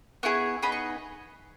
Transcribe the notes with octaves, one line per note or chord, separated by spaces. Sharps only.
B3 E4 G#4 C#6
B3 D#4 G#4 B5
C#6